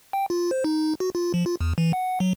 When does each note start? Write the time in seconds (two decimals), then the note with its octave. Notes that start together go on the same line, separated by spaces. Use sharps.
0.13 G5
0.30 F4
0.51 C5
0.64 D#4
1.00 F#4
1.15 F4
1.34 F3
1.46 F4
1.61 E2
1.78 E3
1.93 F#5
2.20 F#3